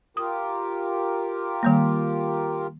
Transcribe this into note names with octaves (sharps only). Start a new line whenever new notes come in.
F4 G4 A#4 D#6
D#3 G3 A#3